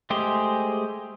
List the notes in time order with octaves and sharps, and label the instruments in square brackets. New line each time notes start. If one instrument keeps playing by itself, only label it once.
[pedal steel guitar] G#3 A3 G4 G#4 C5